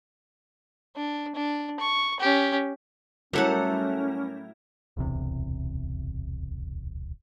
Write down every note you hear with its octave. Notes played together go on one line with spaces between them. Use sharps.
D4
D4
C#6
C#4 G4
A2 F#3 G3 C#4 E4 A4 A#4 F#5
D1 B1 E2 C3